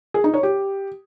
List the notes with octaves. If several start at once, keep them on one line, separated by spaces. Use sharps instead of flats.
G#4
D#4
C#5
G4